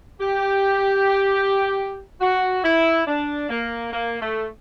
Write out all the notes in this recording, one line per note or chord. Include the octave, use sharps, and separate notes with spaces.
G4
F#4
E4
D4
A#3
A#3
A3